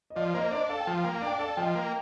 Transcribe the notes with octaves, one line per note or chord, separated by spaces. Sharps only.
D#5
F3 D5 F5
A#3 C5 D#5
D5
D4 C5 D#5
A4 F5
G5
F3
F5
A#3 G5
F5
D4 G5
A4 D5 F5
F3 D#5 G5
A#3